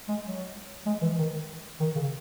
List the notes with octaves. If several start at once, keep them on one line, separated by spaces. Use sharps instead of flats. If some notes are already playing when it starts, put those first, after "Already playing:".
G#3
F#3
G#3
E3
D#3
D#3
C#3